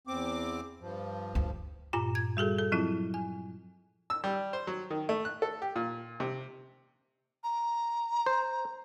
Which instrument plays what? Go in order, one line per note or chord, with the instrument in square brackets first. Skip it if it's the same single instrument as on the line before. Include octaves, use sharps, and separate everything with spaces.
[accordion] E2 C4 D6
G2 F3
[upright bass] D2
[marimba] G2 A#2 F4 A#5
G#6
G3 F#4 G#4 A4
A4
F3 F#3 C4 E4 F4
G#5
[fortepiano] E6
G3
C5
F#3
D#3
A3
F#6
A4
G4
A#2
C3
[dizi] A#5
[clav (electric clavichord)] C5